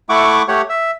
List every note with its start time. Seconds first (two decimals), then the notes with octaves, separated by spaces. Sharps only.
0.09 A3 E4 F#5 C#6 D6
0.48 A3 G4 C#5 F#5
0.69 E5